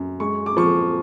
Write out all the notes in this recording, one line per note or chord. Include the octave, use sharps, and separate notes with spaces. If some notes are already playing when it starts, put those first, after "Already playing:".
Already playing: F#2
G#3 C#6
D6
F3 C#6